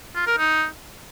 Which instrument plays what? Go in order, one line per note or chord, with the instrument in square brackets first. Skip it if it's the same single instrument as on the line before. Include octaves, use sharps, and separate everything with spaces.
[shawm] F4
A#4
D#4